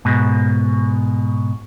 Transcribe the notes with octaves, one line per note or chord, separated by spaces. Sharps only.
G#2 B2